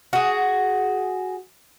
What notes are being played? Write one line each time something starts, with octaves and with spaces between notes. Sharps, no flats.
F#4 G#4